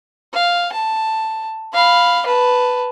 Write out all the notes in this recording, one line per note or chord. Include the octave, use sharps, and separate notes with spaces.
F5
A5
F5 B5
B4 A5